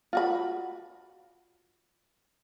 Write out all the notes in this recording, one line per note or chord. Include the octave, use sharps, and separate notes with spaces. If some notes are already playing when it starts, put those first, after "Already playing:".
F4 F#4 B5